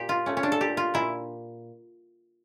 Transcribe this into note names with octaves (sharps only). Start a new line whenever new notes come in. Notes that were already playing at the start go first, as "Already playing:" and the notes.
Already playing: A#2 G4
F4
A3 C#4
C#4
D4
A4
A#2 G4
F4
A#2 E4